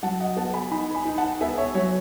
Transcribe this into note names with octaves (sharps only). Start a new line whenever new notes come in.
F#3 F#5 A5
D#5 F#5
B3 F#5 A5
G#5 B5
D#4 G#5 B5
G#5 B5
D#4
F#5 A5
B3 E5 G#5
C#5 E5
F#3 C#5